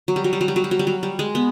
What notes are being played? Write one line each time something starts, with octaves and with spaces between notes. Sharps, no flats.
F#3
G3
F#3
G3
F#3
G3
F#3
G3
F#3
G3
F#3
G3
G#3
B3